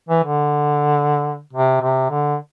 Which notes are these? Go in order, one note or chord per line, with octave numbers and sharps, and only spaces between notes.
E3
D3
C3
C3
D3